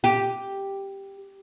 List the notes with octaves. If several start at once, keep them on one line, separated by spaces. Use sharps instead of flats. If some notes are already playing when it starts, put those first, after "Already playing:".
G4